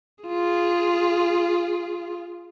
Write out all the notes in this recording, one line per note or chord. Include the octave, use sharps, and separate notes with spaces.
F4 G#4